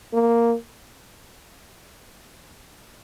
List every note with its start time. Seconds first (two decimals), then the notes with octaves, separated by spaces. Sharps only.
0.13 A#3